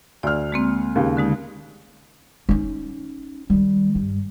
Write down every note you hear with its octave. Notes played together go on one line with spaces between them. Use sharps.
D2 D5 F6
G#3 A#3 C4
D#2 C#3
D3 G#3 D#4
C#4 D#4
D#3 G3
G2